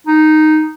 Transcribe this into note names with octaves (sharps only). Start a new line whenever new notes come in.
D#4